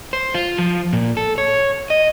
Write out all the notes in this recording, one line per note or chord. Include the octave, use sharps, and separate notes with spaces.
C5
F4
F3
A#2
A4
C#5
D#5